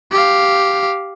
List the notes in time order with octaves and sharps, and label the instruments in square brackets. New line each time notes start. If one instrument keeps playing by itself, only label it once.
[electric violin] G4 F5